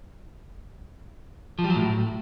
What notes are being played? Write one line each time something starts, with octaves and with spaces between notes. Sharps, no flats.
F3
G3
F#3
A2